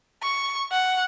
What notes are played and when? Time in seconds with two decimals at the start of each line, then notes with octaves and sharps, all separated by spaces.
0.23 C#6
0.72 F#5